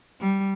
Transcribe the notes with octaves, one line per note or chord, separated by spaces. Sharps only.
G3